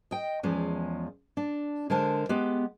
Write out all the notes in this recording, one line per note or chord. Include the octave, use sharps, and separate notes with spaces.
D#5 G5
E2 F3 G#3 C#4
D4
D3 G#3 A#4 C5 A5
G#3 B3 G4